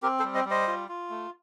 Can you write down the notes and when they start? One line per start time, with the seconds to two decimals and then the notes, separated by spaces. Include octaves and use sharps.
0.03 C4 G4 A#4
0.19 A4 C5
0.24 G3
0.35 C5 D#5
0.45 G3
0.50 C5 D#5
0.67 F4
0.88 F4
1.10 A3